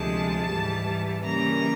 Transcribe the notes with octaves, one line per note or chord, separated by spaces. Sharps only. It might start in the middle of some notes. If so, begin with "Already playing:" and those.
Already playing: D2 C3 F3 G#3 A5
G#2 E3 G3
C#3 E3 G3 A#3 A#5